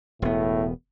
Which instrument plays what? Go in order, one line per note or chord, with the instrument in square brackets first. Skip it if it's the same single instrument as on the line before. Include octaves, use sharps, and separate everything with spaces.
[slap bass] E1 B3 [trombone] A2